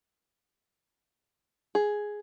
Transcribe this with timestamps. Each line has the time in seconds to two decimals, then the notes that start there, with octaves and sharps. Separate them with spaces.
1.75 G#4